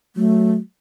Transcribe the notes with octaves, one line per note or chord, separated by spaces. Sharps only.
F#3 A3